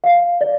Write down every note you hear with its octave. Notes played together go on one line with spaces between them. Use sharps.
F5
D5